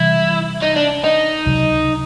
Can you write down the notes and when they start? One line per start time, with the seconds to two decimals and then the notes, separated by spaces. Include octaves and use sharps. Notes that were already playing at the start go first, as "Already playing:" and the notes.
Already playing: C3 E3 G3 E4
0.62 D#4
0.76 D4
1.04 D#4
1.46 C#2 C3 D#3 F#3